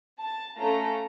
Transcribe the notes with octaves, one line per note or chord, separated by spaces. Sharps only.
A5
A3 C#4 F4 A4 A#5